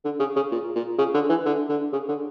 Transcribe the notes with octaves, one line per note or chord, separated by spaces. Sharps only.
D3
C#3
C#3
A#2
A#2
C#3
D3
E3
D3
D3
C#3
D3